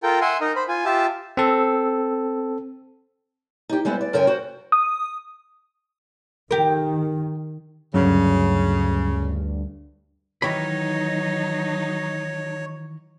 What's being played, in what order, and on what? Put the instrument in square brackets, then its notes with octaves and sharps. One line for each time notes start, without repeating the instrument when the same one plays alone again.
[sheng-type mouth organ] F4 A4 A#4 G5
E5 F#5 G#5 C6
D#4 A#4 D#5
C5 B5
F4 G#5
F4 G4 E5 A5
[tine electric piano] C4 A4
[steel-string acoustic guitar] D#4 G4
G3 G#3 B3 E4 C5
D5
F#2 C#3 A#4 G5 G#5
F#4 C5
[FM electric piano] D#6
[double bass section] D#3 [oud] G4 A#4
[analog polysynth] D2 G2 [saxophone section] C#3 [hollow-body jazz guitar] F#3 C#4 B5
[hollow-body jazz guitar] D#3 E3 B5 [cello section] F#3 D#4 [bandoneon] C#5